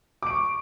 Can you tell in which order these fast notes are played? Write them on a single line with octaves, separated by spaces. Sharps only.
D6 D7 C#6